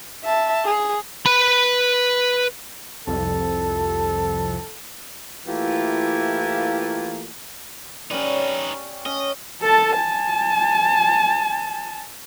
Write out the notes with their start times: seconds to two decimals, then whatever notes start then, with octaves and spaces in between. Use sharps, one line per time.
0.24 E5 A5
0.65 G#4
1.26 B4 B5
3.07 C2 F2 A4
5.46 E3 A3 A#3 E4 F4 G4
8.11 C#4 D#4 G4 B4 D5
9.06 C#4 D#5
9.62 A4 A5
9.95 G#5 A5